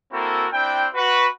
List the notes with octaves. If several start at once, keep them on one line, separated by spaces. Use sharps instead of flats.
A#3 C4 E4 F#4 A4 A#4
C4 D4 E4 G5
F#4 B4